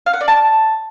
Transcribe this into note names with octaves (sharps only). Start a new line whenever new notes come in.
F5
F#5
D5
A5